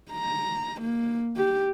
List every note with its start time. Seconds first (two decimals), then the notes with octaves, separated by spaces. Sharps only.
0.11 A#5
0.81 A#3
1.36 G4